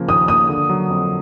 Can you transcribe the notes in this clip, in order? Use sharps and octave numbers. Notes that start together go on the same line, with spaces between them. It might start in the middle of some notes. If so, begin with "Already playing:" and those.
Already playing: C#3 F3 A#3
D#2 D#6
A#3 D#6
D3
F#3
F2